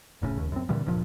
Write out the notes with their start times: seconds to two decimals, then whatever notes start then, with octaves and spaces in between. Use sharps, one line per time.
0.22 F1 A2 C#3
0.37 D1 D#2
0.52 F#2 C4
0.69 A#2 D3 E3 G3
0.86 D1 G2 A#2 F3